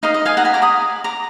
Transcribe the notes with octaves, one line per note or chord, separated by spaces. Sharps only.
D#4 A#4 D#5 F5
D#5
F5 G#5
F#5 A#5
G#5 B5
A#5 D6
B5 D#6
A#5 D6